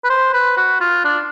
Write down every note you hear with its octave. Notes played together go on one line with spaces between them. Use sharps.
B4
C5
B4
F#4
F4
D4